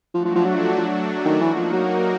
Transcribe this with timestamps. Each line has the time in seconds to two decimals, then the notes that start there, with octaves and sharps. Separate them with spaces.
0.14 F3 F#3 A3 D4 F#4
0.25 F3
0.35 F3
0.46 F#3
0.55 F3
0.78 F3 F#3 A3 D4 F#4
1.25 D#3
1.41 E3 A#3 D#4 F#4 A#4
1.57 F3
1.73 F#3